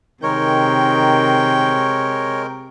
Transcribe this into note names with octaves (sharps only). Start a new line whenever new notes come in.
C3 D#3 G#3 A#4 C#5 G5